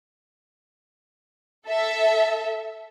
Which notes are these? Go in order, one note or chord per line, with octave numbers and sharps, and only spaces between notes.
A4 E5